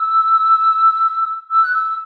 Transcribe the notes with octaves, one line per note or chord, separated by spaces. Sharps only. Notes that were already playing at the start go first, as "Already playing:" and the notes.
Already playing: E6
E6
F#6
E6